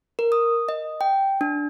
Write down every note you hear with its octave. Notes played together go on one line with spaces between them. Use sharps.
A#4
D#6
D#5
G5
D4